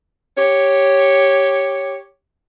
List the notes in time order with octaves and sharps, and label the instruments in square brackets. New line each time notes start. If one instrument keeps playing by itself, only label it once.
[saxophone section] G4 C#5